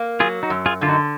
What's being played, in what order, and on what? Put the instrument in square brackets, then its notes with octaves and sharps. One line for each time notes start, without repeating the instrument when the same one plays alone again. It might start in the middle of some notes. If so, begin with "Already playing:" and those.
Already playing: [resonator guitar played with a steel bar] A#3
[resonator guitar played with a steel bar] F#3 [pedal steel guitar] F4 G#4
[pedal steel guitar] D#4 F#4
[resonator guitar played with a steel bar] F#2
[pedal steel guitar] F4 G#4
[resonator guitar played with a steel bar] D3 [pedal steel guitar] F4
[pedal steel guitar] D#4 F#4